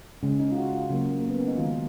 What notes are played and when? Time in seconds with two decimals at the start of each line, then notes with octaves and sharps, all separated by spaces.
0.23 C#3 G#3 C#4
0.40 D#4
0.52 F4
0.57 F#4
0.73 F4
0.90 C#3 F#3 A#3
1.20 A#3
1.30 B3
1.39 C#4
1.48 D#4
1.57 D#3 G#3 F4